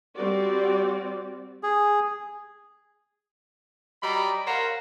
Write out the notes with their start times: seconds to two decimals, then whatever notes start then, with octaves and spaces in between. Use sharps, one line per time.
0.15 G3 C4 F#4 D5
1.63 G#4
4.03 F#3 G3 D5 D#5 A#5 B5
4.47 A#4 C5 C#5 F5 F#5 A#5